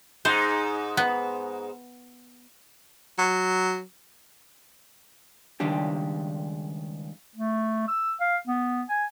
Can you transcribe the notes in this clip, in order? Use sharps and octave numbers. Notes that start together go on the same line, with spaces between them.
G#2 D#4 C5
B3
F#3
C#2 D#3 G3 D4 G4
A3
E6
F5
B3
G#5